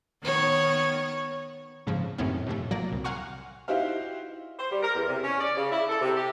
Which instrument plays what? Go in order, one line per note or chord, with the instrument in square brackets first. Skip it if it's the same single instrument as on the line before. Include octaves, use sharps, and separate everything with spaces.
[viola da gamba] D#3 B3 C#5
[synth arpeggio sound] F2 G#2 C#3 F3
F#2 A2 C3 D#3 B3 C#4
F2 A2 C3 A3
A#1 F#3 A#3 D5 A#6
C2
F5 F#5 G#5 A#5 C6 C#6
[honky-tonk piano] D#4 E4 F#4 G4 C5 F5
[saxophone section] C5
G3
A#4
E2
C3
C#4
D5
C#3
E4
A4
C3
G4